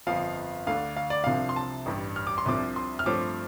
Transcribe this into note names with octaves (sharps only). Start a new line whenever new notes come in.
G1 F2 F3 F5
D2 D3 A3 D4 F5
F5
D5
C2 C3 F3 D4 F5
C6
A5
A1 G2 G3
F6
D6
C6
C2 C3 F3 D4 D6
C6
F6
G2 F3 A3 C4 D6